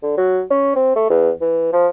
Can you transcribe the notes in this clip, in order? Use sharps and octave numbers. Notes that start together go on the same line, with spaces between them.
D3
F#3
C#4
C4
A3
E2
E3
F3